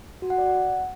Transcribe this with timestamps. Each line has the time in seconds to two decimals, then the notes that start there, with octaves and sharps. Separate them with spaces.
0.22 F#4
0.30 F#5
0.38 D5
0.46 F#5